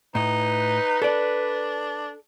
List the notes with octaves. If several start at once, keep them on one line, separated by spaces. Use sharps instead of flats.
A2 D#4 B4
D4 A4 D5